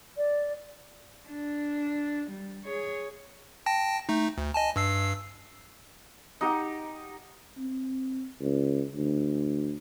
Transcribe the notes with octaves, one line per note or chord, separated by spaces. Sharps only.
D5
D4
G3
G#4 C#5
G5 A5 A#6
A3 D#4
D2
D#5 G#5 A5
G2 E6 C7
D#4 G4 F#5
C4
C#2
D2